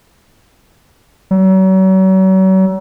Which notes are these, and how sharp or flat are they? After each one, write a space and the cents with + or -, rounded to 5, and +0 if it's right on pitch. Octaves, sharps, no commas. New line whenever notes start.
F#3 +40